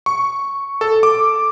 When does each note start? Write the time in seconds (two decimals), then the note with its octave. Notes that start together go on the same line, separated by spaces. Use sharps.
0.06 C#6
0.81 A4
1.03 D6